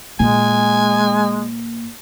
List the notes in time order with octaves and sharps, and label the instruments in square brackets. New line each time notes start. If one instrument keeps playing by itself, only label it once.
[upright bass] A#2 [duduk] G#3 [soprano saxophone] G#5